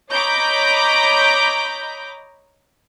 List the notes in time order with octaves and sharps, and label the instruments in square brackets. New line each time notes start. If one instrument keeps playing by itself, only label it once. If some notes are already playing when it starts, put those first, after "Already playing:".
[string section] C#5 D#5 A#5 B5 D6 G6